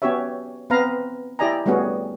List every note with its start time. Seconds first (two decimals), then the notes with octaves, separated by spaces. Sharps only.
0.02 B3 C#4 F#4 G4 C#5 E5
0.70 B3 C4 B4 F5 A#5
1.39 E4 G4 D5 D#5 G#5 A#5
1.66 G3 A3 B3 C#4 F#4 G#4